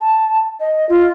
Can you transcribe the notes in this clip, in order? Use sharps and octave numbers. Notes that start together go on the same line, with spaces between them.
A5
D#5
F4